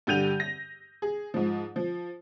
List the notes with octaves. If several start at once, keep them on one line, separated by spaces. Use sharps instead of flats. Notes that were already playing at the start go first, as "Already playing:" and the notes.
G2 D3 G4 G6 D#7 F7
A#6
G#4
G#2 F3
F3